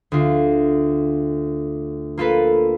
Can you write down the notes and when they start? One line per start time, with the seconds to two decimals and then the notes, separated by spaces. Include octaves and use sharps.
0.12 D2 F4
2.18 A#3 F4 A4 B4